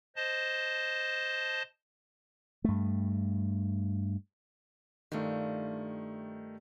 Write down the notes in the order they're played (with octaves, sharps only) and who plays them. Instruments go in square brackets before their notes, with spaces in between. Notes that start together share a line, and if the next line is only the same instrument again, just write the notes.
[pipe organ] C5 D#5 A5
[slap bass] G2 A3
[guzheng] G2 F4 [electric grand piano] D#3 A3